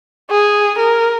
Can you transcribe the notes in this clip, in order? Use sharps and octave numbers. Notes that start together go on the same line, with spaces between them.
G#4
A#4